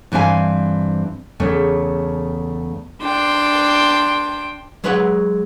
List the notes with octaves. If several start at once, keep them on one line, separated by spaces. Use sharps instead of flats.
G2 E3 C4 F5 G#5
E2 C#3 A3 C#5
D4 G5 C6
F#3 G#3 B4 C#5 F#5